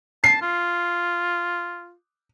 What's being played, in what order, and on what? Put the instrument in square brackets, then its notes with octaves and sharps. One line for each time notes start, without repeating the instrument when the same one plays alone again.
[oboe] A5 [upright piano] C7
[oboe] F4